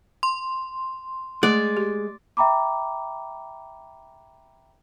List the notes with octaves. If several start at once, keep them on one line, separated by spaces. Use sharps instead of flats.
C6
G#3 A3 D5
G4
E5 G5 A#5 B5 D6